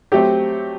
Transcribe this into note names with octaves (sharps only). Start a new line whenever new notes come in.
F#3 A3 C4 G4